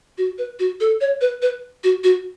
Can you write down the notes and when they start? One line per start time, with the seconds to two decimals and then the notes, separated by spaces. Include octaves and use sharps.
0.18 F#4
0.38 B4
0.59 F#4
0.80 A4
1.01 C#5
1.21 B4
1.42 B4
1.84 F#4
2.04 F#4